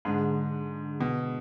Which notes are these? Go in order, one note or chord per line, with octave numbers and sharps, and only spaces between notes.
G#2 D3 G#3 D4 G#4
B2